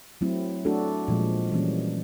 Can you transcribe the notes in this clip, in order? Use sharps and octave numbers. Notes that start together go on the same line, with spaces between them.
F#3 A3 C4 E4
A3 D4 F#4 A4
A#2 F3 G#3
E3 G3 A#3 C#4